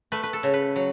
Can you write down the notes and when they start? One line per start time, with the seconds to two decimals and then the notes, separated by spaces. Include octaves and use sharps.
0.12 A3 B4
0.23 B4
0.33 A4
0.43 C#3
0.54 B4
0.76 F#3